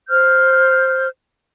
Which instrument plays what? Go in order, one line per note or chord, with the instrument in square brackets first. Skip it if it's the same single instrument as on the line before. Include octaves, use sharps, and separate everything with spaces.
[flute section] C5 F6 G6